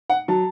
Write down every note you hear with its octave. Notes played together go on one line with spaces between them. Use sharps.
F#5
F#3 A5